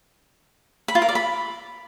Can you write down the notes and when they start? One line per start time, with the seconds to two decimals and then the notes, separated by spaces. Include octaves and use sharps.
0.88 B5
0.95 F4
1.02 A#4
1.09 D5
1.15 B5